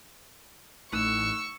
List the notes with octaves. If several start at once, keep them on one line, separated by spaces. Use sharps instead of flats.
A1 A2 A3 D#4 C#6 E6 F#6